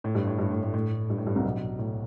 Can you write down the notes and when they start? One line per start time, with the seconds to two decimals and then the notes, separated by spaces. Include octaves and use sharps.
0.04 A2
0.15 G2
0.27 A2
0.39 G2
0.51 A2
0.63 A2
0.74 A2
1.10 G2
1.18 A2
1.27 G2
1.36 C2 C3
1.44 B1 B2
1.79 A2